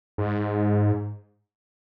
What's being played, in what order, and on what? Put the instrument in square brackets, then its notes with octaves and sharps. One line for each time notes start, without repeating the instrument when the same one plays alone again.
[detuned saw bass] G#2